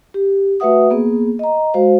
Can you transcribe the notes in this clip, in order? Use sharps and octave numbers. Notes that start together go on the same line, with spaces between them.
G4
A3 F#4 B4 E5 F#5 D#6
A#3 B3 G#4
D#5 A#5
G#3 F#4 C5 F5